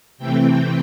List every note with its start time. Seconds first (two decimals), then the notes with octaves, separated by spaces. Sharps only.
0.18 C3 E3 A3 C4 G5